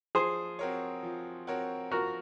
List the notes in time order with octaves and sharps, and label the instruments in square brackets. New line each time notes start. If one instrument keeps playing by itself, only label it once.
[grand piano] F3 [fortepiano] G#4 C5
[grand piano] C4 F#4 A#4 C#5
F3
C4 F#4 A#4 C#5
[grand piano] F3 [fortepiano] F#4 A#4